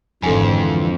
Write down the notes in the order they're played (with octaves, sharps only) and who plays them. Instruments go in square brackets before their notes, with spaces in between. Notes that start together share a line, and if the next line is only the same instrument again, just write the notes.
[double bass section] G#1 [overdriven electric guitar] F2 [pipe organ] D3 E3 [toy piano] A4 G#5